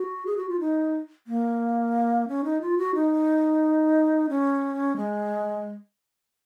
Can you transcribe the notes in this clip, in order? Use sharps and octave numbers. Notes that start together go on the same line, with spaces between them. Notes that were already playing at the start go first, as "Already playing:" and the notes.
Already playing: F#4
G#4
F#4
F4
D#4
A#3
C#4
D#4
F4
F#4
D#4
C#4
G#3